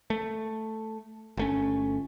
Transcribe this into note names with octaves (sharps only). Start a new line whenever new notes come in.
A3
G1 A3 C#4